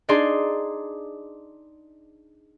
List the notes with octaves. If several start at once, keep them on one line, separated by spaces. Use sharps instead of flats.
D4 D#4 G#4 D5 C6